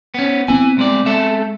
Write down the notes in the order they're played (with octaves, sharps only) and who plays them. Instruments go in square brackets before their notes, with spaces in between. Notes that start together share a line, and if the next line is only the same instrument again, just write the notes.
[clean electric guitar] B3 C#4
[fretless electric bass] B3 C4 [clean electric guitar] E4 G#5
[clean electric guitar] C2 G#3 D5
G#3 A4 E5